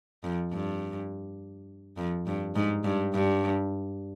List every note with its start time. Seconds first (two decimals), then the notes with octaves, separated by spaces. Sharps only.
0.24 F2
0.53 G2
1.97 F2
2.27 G2
2.55 G#2
2.84 G2
3.13 G2